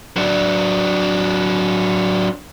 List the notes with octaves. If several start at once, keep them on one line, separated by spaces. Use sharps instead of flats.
F#3 D4